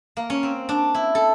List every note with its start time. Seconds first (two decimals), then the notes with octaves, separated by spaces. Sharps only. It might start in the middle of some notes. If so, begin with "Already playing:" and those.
0.17 A#3
0.30 C#4
0.43 C4
0.69 D4
0.94 E4
1.15 A4